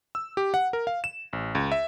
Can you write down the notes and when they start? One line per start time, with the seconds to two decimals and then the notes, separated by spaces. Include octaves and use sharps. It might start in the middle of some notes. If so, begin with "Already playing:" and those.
0.15 E6
0.37 G4
0.54 F#5
0.73 A#4
0.87 F5
1.04 E7
1.33 A1
1.55 C#2
1.72 E5